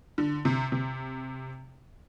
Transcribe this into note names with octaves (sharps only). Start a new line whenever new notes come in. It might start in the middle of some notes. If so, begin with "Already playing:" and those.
D3
C3
C3